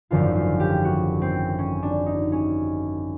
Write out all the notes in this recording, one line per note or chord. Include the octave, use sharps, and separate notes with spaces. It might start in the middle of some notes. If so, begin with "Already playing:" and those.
G#1 F#2 D3 F3 F4
F4
G4
F#4
C4
C#4
D4
D#4
C#4